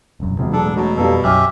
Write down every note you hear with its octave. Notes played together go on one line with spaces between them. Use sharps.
E1 C2 F#2
E1 C3 F3
A2 F#3 G#3 D4 A4
B2 F#3 A3
F2 G3 A#3 B3 A4
B1 F#2 C#4 G4 E5 F6